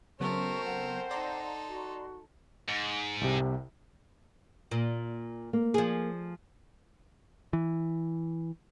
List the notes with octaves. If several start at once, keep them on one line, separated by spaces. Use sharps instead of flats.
C#3 F#3 A3 B3 C4 A#4 C5 C#6
F#5
D#4 A4 D5 A#5 C6
F#4
G#2
C2 C3
A#2
A#3
F3 G#4
E3